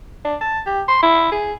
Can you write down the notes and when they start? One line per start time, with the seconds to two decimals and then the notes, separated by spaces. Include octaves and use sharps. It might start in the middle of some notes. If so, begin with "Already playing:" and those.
0.25 D4
0.41 A5
0.66 G4
0.88 C6
1.03 E4
1.32 G#4